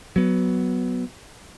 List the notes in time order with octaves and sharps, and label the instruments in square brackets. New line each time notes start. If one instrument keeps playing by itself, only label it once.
[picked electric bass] F#3 B3